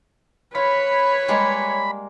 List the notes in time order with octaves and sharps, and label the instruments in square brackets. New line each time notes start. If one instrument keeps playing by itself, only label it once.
[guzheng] F4 [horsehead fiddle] B4 [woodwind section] C#5 [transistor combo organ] B5
[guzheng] G3 G#3 A#3